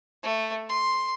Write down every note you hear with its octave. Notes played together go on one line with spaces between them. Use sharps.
A3
C6